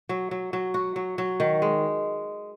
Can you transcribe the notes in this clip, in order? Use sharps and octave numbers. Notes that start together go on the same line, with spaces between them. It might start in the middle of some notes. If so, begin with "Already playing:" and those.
F#3
F#3
F#3
F#4
F#3
F#3
D#3
G#3